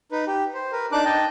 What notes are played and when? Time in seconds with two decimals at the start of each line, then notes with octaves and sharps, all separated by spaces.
0.12 D#4 B4
0.27 G4
0.54 C5
0.72 A#4 B4
0.92 D4 D#4 D6 F#6
1.05 D#5 G5 A5